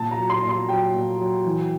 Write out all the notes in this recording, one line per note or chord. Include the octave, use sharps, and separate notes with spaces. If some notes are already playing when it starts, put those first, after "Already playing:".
Already playing: A#2 A5
A#5
F#3
C6
A#2
C6
F#3 G5
A#2
F#3
E3